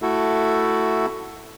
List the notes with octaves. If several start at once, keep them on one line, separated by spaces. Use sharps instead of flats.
A3 E4 F#4 A4